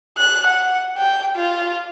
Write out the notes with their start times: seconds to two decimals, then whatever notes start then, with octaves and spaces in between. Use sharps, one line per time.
0.18 F#6
0.47 F#5
0.97 G5
1.36 F4